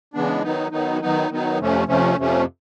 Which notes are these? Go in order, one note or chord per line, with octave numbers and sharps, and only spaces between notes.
C#3 E3 G#3 B3 D4
D#3 F#3 B3 D#4
D#3 F#3 B3 D#4
D#3 F#3 B3 D#4
D#3 F#3 B3 D#4
F2 C3 F3 A3 C#4
F2 C3 F3 A3 C#4
F2 C3 F3 A3 C#4